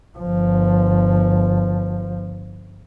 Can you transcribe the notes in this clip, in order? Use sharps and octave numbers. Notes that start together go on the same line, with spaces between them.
G1 F3